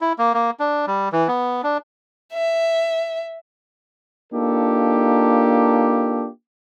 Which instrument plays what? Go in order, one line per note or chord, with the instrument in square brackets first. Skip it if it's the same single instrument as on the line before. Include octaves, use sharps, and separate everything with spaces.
[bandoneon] E4
A#3
A#3
D4
G3
E3
B3
D4
[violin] E5
[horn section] A#3 D4 D#4 F4 G4 A4